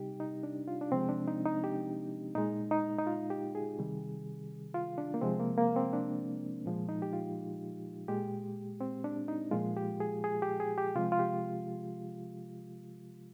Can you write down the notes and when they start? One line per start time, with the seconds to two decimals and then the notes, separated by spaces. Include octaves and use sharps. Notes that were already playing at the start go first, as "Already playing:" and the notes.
Already playing: C3 G3 D#4 G4
0.20 D#4
0.43 D4
0.68 F4
0.81 D4
0.92 C3 F3 G#3 C4
1.09 D4
1.28 D#4
1.46 D#4
1.64 G4
2.35 A#2 G#3 D#4
2.71 D#4
2.98 D#4
3.07 F4
3.30 G4
3.55 G#4
3.78 C3 D#3 G3
4.74 F4
4.98 D4
5.14 A#3
5.21 C3 F3 G#3 C4
5.40 A#3
5.58 A#3
5.76 C4
5.93 D4
6.66 A#2 F3 G#3
6.89 D#4
7.02 G4
7.13 F4
8.08 A#2 G#3 G4
8.81 C4
9.04 D4
9.28 D#4
9.51 A#2 F3 G#3 F4
9.77 G4
10.00 G#4
10.24 G#4
10.42 G4
10.60 G#4
10.78 G4
10.95 C3 F3 G#3 F4
11.12 F4
11.19 G4